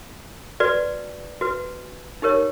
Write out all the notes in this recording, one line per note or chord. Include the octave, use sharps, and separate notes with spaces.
F#4 B4 D5
F#4 B4
D#4 G4 A#4 C#5